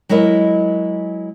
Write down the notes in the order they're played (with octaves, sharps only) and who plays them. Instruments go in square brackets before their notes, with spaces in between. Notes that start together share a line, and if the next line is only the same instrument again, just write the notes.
[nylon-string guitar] F#3 G#3 E4 A#4 D#5